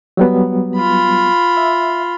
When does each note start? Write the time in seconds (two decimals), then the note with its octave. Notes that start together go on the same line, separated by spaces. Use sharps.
0.17 F#3 G3 B3
0.76 F4 B5
1.57 E5